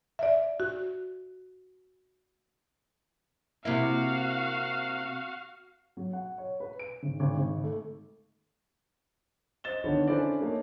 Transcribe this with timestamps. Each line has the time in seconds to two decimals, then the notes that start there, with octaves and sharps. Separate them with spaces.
0.19 D5 E5
0.60 F#4
3.65 C3 A#3 E4 F#4 F5
5.97 F#3
6.13 F#5
6.38 C#5
6.60 B4
6.79 D7
7.03 G#1
7.20 G#1
7.37 G#1
7.64 A3
9.64 C5 D#5 A6 E7 G7
9.84 D3 D#3 B3 D4 B4 C#5
10.08 C#4 D4 E4 A4 C5 D5
10.41 A3 A#3 D#4 C#5